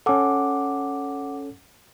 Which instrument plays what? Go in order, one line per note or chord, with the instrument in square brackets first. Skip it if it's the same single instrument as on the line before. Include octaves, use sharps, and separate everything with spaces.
[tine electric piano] C#4 A4 [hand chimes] F#5 D6